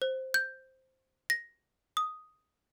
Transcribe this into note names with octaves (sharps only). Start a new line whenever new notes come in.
C5
G6
A#6
D#6